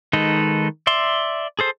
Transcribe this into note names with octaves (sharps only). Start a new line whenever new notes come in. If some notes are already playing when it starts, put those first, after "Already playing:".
D#3 G#3 D#4 A4 B4
D5 E5 C6
G#4 A4 C5